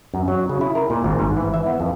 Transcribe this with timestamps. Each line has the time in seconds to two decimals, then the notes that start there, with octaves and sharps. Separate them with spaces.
0.14 F#2
0.28 F#3
0.49 C#3
0.61 E4
0.75 A#4
0.90 A#2
1.04 G#1
1.19 G#2
1.37 E3
1.54 E5
1.66 B3
1.80 F2